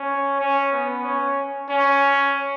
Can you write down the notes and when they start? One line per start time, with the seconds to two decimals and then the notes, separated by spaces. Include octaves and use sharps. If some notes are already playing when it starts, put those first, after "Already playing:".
Already playing: C#4
0.40 C#4
0.72 B3
1.04 C#4
1.69 C#4